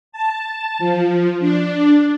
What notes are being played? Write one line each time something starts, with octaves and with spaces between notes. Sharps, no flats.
A5
F3
D4